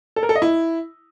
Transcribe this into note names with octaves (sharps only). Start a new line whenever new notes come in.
A4
A#4
A4
D#5
E4